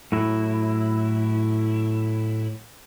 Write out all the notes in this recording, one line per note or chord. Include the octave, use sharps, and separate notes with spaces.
A2 F#3 E4